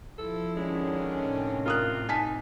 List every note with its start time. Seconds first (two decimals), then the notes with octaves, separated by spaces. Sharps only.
0.18 F3 E4 A4
0.56 D3 D#3 G#3 C#4
1.22 A2 C3
1.66 F4 A#4 D#6 F#6
2.09 D#4 G#5 A5 B6